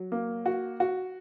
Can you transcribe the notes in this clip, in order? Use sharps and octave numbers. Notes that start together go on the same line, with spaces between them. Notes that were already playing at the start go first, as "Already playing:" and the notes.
Already playing: F#3
A#3
F#4
F#4